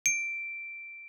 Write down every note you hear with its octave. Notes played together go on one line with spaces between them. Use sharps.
D7